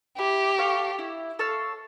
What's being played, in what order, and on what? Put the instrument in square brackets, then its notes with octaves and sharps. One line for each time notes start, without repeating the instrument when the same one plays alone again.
[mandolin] E4 [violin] G4
[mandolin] A4 C#5 F5
E4
A4 C#5 F5